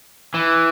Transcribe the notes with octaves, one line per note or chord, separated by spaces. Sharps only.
E3